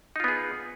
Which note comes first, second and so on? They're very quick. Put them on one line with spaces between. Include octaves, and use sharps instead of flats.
D#4 F4 B3 G#4